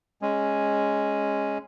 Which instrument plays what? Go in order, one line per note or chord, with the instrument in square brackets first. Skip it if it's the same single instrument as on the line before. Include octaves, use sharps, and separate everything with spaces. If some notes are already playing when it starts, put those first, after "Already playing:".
[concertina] G#3 C#4